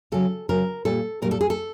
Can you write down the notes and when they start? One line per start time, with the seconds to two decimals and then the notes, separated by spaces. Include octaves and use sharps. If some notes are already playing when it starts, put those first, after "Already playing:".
0.12 C#3 F#3 A4
0.49 C#3 F#3 A#4
0.85 A#2 G3 A4
1.22 A#2 G3 A#4
1.31 A4
1.41 G#4
1.50 A4